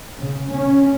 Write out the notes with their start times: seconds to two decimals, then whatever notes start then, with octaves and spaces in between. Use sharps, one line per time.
0.20 C#3
0.53 C#4